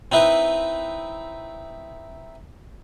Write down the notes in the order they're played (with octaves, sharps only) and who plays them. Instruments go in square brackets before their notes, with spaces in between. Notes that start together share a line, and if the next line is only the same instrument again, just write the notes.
[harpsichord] C4 D#4 E4 B4